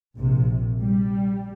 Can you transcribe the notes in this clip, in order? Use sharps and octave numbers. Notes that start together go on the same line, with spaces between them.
A#1 C3
G3